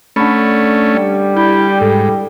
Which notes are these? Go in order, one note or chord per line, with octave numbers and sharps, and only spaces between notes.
D3 A3 C#4 B5
G3
E4 G4
G#2 A4